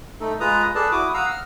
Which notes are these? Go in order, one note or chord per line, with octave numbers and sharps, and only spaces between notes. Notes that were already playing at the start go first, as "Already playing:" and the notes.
A3 D#4 A4
G#3 F4 B4 A#5 D#6
G#4 A4 B4 D5 A5
E4 F#4 D6 D#6
F5 F#5 A#5 D#6 E6
F6